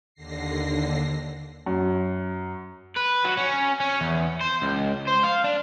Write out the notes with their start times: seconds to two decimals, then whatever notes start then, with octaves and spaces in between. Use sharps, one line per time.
0.14 D#2 D3 A#6 C7
1.66 F#2
2.97 B4
3.25 F#3
3.37 C#4
3.80 C#4
4.01 E2
4.41 C5
4.62 C#2
5.07 C5
5.23 F5
5.44 D4